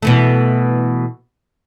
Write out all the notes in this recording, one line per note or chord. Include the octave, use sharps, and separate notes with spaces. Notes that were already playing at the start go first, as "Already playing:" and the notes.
B2 E3 A3